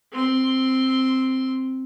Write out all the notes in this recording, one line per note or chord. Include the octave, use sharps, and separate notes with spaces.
C4 C6